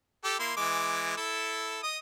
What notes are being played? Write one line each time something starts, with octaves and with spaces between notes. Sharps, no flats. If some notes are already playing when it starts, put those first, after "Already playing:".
G4 A4
A#3 E4 C6
E3 G#3 D6
E4 A4
D#5 D#6